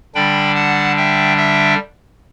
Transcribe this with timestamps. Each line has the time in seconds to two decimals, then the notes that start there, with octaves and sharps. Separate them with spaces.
0.15 D3 G3 D4 G5 B5
0.55 F#5 A5
0.97 E5 G5
1.37 E5 G5